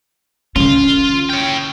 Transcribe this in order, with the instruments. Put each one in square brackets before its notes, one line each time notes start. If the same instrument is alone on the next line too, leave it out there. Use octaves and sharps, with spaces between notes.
[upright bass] D3 C#4 [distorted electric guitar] F4
[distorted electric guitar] C#5 G5